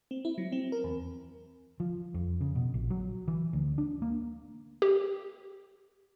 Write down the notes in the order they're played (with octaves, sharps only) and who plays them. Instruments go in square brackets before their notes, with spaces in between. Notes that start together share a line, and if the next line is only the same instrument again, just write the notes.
[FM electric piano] C4
E4
F#3
C4
A#4
E2
[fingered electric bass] F3
F2
C#3
B2
A#1
F#3
E3
D2
D4
A#3
[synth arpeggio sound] G4